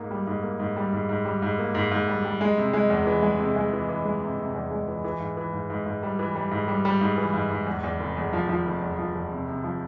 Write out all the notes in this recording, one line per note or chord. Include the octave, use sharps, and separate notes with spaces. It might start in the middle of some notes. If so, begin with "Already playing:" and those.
Already playing: G#2 A#3
G3
G#2
A#3
G#2
G3
G#2
G#2
G3
G#2
A#3
G#2
G#2
G3
G3
G#3
C3
G#3
E2
E3
G#3
C3
G#3
E3
E3
G#3
C3
C3
E2
G#3
E3
E3
G#2
E3
G#2
G#2
G#2
G3
E3
G3
G#2
G3
G3
G#2
E3
G#2
G#2
E2
E2
F1
E2
F3
F3
F1
E2
F3
E2
C3
C3
F3